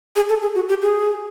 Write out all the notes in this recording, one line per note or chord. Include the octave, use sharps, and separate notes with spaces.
G#4
A4
G#4
F#4
G4
G#4